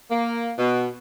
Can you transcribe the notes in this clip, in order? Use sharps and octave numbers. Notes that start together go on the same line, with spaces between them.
A#3
B2